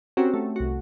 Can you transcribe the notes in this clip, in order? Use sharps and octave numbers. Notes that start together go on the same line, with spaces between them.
C4 C#4 F#4 G4 A#4
A3
C2 F#4